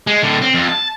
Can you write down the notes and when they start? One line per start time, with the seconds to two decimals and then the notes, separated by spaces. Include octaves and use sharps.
0.07 G#3
0.22 A2 D3
0.42 C4
0.54 F2
0.69 A5